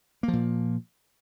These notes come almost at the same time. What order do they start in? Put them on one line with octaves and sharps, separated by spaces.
A#3 F3 A#2